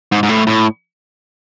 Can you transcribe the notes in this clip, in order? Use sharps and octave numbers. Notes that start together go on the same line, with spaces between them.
G#2
G#2
A2
A2